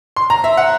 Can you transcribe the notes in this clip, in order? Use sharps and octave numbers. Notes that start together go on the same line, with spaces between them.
C6
A#5
E5
F#5